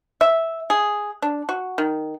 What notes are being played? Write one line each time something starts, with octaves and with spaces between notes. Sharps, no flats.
E5
G#4
D4
F#4
D#3